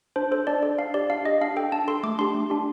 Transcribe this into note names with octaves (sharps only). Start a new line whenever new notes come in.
D4 C5
A4 C5
D4 D5
A4 D5
D4 F5
G4 D5
D4 F5
G4 D#5
D4 F5
A4 G5
D4 A5
A4 C6
A3 D6
D4 G4 C6
A3
D4 G4